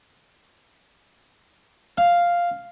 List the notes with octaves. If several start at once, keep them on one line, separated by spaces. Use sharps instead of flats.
F5